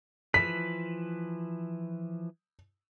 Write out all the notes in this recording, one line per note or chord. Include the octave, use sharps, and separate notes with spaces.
E3 F3 B4 B6